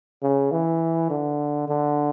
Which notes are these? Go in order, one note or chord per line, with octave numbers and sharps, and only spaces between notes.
C#3
E3
D3
D3